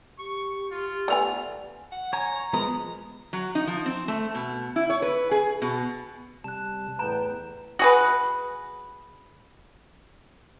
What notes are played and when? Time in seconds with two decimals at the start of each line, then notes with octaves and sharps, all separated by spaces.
0.19 G4 C#6
0.72 F4
1.08 A3 B3 D5 G#5 F7
1.91 F#5
2.13 C#5 G#5 A#5
2.53 F3 G#3 B3 A#5
3.33 F#3
3.55 D#4
3.67 F3
3.86 C4
4.08 A3
4.35 B2
4.76 E4
4.90 C#5
5.02 B4
5.31 G#4
5.62 B2
6.44 C3 G3 A5 F#6
6.99 E2 A2 B3 G5 A#5
7.79 F#4 G#4 B4